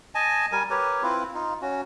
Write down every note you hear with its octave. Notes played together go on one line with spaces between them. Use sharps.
D#5 G#5 A5
G3 A#4 G#5
G4 A#4 B4 C#5
C4 E4 F4 B4
D#4 F4
C#4 F#4